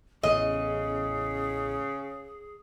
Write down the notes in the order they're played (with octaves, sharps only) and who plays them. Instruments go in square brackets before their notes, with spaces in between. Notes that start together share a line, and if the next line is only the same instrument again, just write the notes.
[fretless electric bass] A1 E2 [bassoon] C#3 [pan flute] G#4 [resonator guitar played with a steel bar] D#5